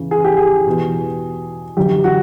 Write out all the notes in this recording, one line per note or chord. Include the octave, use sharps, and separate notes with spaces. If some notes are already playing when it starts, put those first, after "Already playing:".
Already playing: E2 C#3 E3
G#4
G4
G#4
E2 B2
F#2 D3 G4
F#4